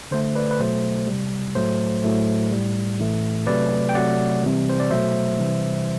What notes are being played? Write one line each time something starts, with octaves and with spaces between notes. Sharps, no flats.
D3 A3 C5
B4 D5
B4
B2 F#3 A3 C5
C3 G3
A2 F#3 A3 C5
A2 F#3 A3
A2 G3
A2 E3 A3
C3 F#3 A3 B4 D5
G5
C3 F#3 A3 D5 F#5
C3 E3 G3
C5
D5
B2 F#3 A3 C5 E5
C3 E3 G3